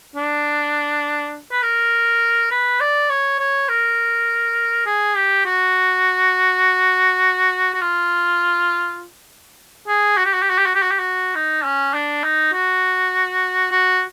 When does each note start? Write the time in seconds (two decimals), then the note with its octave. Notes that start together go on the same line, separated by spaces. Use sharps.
0.15 D4
1.52 B4
1.62 A#4
2.51 B4
2.81 D5
3.10 C#5
3.39 C#5
3.69 A#4
4.86 G#4
5.16 G4
5.46 F#4
7.74 F#4
7.81 F4
9.88 G#4
10.17 F#4
10.25 G4
10.34 F#4
10.42 G4
10.50 F#4
10.58 G4
10.66 F#4
10.75 G4
10.82 F#4
10.91 G4
10.99 F#4
11.35 D#4
11.65 C#4
11.94 D4
12.24 D#4
12.53 F#4
13.71 F#4